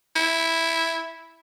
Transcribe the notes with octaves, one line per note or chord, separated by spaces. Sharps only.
E4